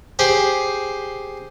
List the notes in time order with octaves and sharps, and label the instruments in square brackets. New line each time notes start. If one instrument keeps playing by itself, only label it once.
[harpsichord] G4 G#4 C5